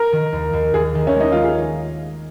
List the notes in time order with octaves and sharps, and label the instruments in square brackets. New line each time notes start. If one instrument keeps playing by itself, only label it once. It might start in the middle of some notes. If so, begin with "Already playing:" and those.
Already playing: [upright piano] A#4
[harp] D#3
D#2
D#2
[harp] D#2 [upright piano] G#4
[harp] D#3
[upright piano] C#4
[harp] G#3 [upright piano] D#4
[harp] G#3 [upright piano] F4
[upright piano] G#4